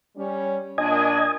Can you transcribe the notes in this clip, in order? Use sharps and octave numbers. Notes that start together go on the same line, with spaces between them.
G3 C#4
A#2 D4 D#5 G#5